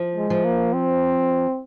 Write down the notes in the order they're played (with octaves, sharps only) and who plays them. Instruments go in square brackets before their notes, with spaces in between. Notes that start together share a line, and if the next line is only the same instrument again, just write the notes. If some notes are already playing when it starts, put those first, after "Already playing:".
Already playing: [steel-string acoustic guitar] F3
[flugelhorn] G#3
[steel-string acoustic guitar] F3
[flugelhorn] A#3
C4